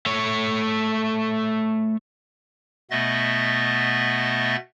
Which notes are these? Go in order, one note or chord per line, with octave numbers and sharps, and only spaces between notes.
A3 C#5
B2 A3 B3 D#5 E5 A6